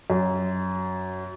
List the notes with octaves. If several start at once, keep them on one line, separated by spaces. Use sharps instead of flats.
F#2